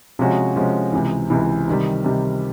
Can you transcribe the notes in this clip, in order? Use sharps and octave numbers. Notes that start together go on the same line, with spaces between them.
C3 F3 G#3 C#4 F#4
C3 F3 G#3 C#4 F#4
C#2 C3 E3
C#2 C3 E3
C3 D#3 G3
C3 D#3 G3